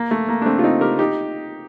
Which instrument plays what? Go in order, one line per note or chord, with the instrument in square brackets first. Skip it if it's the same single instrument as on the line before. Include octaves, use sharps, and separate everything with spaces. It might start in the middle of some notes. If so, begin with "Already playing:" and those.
Already playing: [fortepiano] A#3
A3
A#3
D4
A3 C4
F4
C4 D#4
G4 A#4
D#4 G4